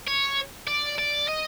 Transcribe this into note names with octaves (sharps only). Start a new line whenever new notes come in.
C#5
D5
D5
D#5